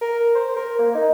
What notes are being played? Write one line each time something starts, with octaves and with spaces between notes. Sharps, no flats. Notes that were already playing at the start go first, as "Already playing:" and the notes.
A#4
C5
A#4
A#3
D#4